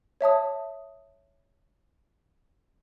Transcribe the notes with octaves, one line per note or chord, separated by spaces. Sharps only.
C#5 E5 A5 D#6